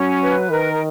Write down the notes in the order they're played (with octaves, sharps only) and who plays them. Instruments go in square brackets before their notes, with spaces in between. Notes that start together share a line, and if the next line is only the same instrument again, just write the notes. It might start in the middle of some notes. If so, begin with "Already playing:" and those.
Already playing: [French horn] F#3 [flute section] C#4
[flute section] B4
[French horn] D#3 [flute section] A#4